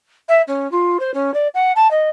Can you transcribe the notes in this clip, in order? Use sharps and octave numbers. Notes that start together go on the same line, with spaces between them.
E5
C#4
F4
C5
C#4
D5
F#5
A5
D#5